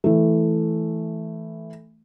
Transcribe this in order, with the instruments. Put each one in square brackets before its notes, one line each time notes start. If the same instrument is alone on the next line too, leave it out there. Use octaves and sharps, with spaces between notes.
[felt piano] E3 A3